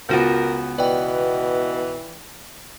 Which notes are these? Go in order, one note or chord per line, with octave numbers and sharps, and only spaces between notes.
C#2 B3 F4 F#4 A#4 G6
B2 E3 D5 G5